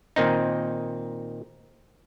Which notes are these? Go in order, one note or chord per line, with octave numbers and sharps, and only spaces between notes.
A#2 D#3 C4 D#4